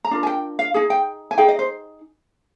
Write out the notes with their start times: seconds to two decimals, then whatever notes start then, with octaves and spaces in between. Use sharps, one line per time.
0.05 A#5
0.11 D4 F4 A#4
0.23 G#5
0.27 G5
0.59 F5
0.74 D#4 G#4 G#5
0.90 G5
1.31 G#5
1.38 D#4 G#4 G5
1.48 D#5
1.59 C5